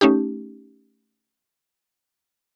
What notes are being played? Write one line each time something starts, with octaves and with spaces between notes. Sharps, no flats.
A3 C#4 D#4 G4